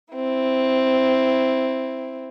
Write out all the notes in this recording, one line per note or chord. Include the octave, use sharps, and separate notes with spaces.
C4 E4